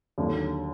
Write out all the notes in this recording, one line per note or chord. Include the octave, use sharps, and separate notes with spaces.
D#2 D3 F#3